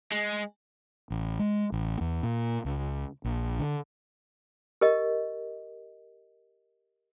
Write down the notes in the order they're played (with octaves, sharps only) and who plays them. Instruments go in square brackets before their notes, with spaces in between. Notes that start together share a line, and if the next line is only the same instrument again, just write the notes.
[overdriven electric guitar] G#3
[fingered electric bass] A1
G#3
A1
E2
A#2
C#2
A#1
D3
[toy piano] G4 A#4 D#5